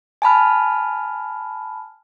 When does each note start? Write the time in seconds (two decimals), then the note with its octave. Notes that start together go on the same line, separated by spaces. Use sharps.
0.22 G#5 A5 B5 F6